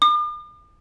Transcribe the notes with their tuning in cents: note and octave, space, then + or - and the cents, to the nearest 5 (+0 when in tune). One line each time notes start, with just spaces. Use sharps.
D6 +45